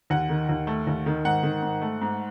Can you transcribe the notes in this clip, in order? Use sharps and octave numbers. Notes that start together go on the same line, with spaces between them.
D#2 F#5
D#3
D#2
A3
D#2
D#3
G#2 F#5
D#3
G#2
A3
G#2